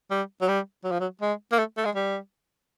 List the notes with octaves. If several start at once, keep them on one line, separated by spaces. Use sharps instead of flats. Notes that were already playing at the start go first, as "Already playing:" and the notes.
G3
F#3
G3
F#3
F3
F#3
G#3
A#3
A3
A3
G#3
G3